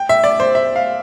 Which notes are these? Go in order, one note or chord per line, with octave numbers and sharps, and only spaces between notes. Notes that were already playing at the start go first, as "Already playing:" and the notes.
Already playing: G5
E5
D5
C5
E5
F5